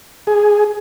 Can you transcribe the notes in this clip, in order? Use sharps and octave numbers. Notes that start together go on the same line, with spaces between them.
G#4